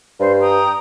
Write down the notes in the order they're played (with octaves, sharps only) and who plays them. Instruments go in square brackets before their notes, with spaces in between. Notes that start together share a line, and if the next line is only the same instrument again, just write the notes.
[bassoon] G2 [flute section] C5
[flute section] G5 A#5 D#6